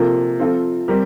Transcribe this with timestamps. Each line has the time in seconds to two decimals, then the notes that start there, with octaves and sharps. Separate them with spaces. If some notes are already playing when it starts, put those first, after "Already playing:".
Already playing: C3 F3 A#3 F4 A4
0.39 F3 C4 F4 A4
0.88 G3 C4 G4 A#4